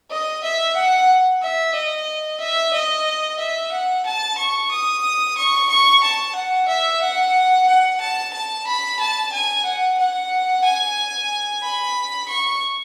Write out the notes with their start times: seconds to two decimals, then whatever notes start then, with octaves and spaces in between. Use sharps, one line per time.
0.10 D#5
0.43 E5
0.75 F#5
1.42 E5
1.74 D#5
2.40 E5
2.73 D#5
3.39 E5
3.72 F#5
4.06 A5
4.38 C#6
4.71 D#6
5.37 C#6
5.69 C#6
6.03 A5
6.35 F#5
6.68 E5
7.01 F#5
7.67 F#5
8.00 A5
8.33 A5
8.67 B5
9.00 A5
9.32 G#5
9.65 F#5
9.98 F#5
10.64 G#5
11.63 B5
12.28 C#6